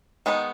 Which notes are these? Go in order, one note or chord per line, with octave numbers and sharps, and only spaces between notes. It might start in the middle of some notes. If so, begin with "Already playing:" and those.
D#3 G#3 B3 D#4